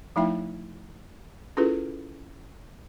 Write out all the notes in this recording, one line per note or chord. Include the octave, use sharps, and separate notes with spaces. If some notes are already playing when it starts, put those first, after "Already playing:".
F3 A3 D#4 E4 E5 G5
C#4 E4 F4 G#4 A4 B4